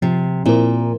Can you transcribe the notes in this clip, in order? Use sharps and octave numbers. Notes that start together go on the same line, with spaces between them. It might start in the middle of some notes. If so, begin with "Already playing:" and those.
C3 F3
A#2 C4 E4 A#4